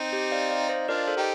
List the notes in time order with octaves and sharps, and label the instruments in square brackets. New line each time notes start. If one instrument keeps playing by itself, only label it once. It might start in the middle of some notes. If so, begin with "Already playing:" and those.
Already playing: [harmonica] C4 D#4
[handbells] G4
D5 F5
D5 F5
C5 D#5
[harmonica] D4 F4 [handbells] A#4 D5
[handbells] A4 C5
[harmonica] D#4 G4 [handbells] G5